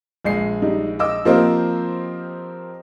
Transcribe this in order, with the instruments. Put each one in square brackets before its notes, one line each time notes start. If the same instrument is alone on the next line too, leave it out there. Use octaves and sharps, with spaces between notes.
[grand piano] A#1 G#3 C7
[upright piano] G3 D#4
D#5 D6 E6
[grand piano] F3 A#3 C4 [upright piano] G4 C5 D#5